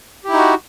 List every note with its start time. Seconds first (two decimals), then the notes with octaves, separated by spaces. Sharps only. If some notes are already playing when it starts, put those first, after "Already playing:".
0.24 G4
0.28 E4
0.33 D#4
0.37 F#4